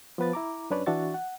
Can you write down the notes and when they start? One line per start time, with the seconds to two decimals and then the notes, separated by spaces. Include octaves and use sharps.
0.18 F3 B3 B4 A6
0.33 E4 A#5 D6
0.70 F#2 C#4 D4 B4 C#5 D5
0.86 E3 D4 F#4 E5 C#6 A6
1.14 F#5